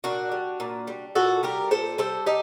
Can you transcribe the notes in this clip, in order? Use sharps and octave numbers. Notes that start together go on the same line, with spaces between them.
A#2 D4 F#4
G3
A#2
G3
A#2 F#4 A4
G3 G4 A#4
A#2 A4 C5
G3 A4 C5
D#4 G4